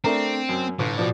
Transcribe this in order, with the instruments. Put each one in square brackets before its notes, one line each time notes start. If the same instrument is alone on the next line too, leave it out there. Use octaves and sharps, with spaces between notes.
[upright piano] A3 D4 A#4 [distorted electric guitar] C4
[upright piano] F#2
[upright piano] G1 [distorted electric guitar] A2
[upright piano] B2 F3 D5